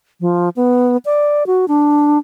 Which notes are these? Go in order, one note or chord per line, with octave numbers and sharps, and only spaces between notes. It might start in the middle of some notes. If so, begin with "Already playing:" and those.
F3
B3
D5
F#4
D4